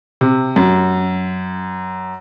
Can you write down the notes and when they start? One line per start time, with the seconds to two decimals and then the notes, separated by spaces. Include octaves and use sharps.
0.21 C3
0.56 F#2